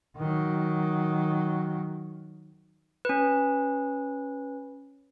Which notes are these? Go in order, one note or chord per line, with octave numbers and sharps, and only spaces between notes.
D#3 F#3
C#4 B4